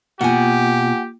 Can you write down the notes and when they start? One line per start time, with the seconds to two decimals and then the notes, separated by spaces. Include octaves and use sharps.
0.21 B2 A#3 F4 G4 F#5 G#5